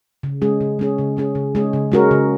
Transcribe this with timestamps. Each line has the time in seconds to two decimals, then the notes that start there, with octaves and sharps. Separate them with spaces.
0.23 C#3
0.42 G#3 C#4 G#4
0.61 C#3
0.79 G#3 C#4 G#4
0.98 C#3
1.17 G#3 C#4 G#4
1.35 C#3
1.55 G#3 C#4 G#4
1.73 C#3
1.92 G#3 C#4 F#4 A#4
2.11 C#3